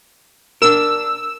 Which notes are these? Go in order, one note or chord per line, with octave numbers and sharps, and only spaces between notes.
D4 A#4 E6